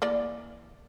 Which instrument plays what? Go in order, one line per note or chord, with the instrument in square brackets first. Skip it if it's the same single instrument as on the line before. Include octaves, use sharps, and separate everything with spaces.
[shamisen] E3 A#3 D5